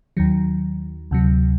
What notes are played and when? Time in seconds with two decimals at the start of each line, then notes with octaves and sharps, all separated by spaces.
0.17 D#2 D#3 F#3
1.11 D2 C3 F#3